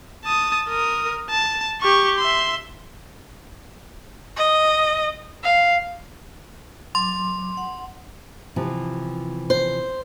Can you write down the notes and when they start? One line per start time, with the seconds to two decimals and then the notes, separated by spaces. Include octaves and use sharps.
0.25 A5 D#6
0.68 A#4 D#6
1.30 A5
1.81 G4 C#6
2.19 E5 C6
4.37 D#5
5.44 F5
6.95 F#3 C6 D6
7.57 F#5
8.56 C3 E3 F3
9.50 C5